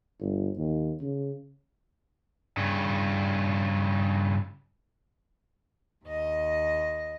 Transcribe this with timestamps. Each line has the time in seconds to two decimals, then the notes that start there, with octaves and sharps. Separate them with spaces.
0.20 G1
0.57 D#2
1.01 C#3
2.57 G2 C#3
6.05 D#2 D#5